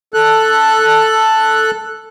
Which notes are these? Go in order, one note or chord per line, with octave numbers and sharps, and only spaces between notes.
A4 F#6